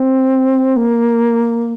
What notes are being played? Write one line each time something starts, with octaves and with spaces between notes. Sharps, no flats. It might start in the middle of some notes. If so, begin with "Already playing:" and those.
Already playing: C4
A#3